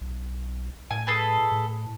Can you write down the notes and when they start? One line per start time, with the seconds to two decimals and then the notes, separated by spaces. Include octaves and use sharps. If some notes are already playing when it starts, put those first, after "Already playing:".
0.01 B1
0.91 A2 G#5
1.07 G#4 A4 B4
1.52 A2